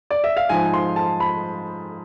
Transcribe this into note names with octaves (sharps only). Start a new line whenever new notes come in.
D5
E5
F5
G#2 F3 G#5
C6
A5
B5